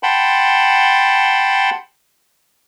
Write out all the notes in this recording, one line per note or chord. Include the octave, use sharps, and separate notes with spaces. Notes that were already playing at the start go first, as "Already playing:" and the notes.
F#5 G5 A5 B5 C6